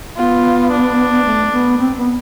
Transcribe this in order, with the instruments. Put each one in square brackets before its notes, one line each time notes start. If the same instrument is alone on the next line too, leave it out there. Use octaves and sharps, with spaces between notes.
[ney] B3 [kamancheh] F4
[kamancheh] D4
[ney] A3
B3
C4
B3